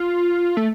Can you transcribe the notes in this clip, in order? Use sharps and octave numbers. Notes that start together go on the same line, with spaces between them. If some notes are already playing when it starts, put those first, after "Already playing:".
Already playing: F4
A3